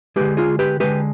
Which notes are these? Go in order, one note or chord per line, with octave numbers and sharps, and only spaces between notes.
D3 G#3 G4 B4
F4 G#4
G4 B4
D3 G#3 G4 B4